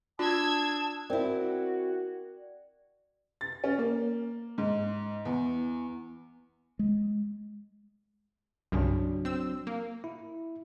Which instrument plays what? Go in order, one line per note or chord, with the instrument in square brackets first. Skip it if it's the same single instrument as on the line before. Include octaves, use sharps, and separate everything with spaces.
[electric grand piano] D4 [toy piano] F4 [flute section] A5 D#6 [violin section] E6 G#6
[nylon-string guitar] C4 E4 [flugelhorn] F#4 [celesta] A#4 G5 [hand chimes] D5
[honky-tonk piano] A6
C#4
A#3
G#2
E2
[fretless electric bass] G#3
[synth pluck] C2 G2 C#3 [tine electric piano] F#3 D4
[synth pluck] C4 E6
A#3
[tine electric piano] E4